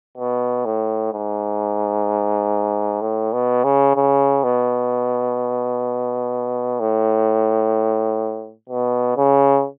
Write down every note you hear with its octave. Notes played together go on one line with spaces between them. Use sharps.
B2
A2
G#2
A2
B2
C#3
C#3
B2
A2
B2
C#3